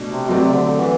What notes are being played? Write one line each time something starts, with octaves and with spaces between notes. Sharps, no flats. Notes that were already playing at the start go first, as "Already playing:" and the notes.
Already playing: B2 A3 D4
C3
B2 F#3 A3 C4 G4 D5
C3
D3
E3